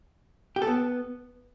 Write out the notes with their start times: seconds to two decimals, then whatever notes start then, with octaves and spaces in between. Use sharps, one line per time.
0.56 G4
0.62 A4
0.67 B3